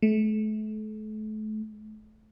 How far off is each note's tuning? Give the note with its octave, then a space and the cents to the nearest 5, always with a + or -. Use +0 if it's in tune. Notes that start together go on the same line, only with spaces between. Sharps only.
A3 -35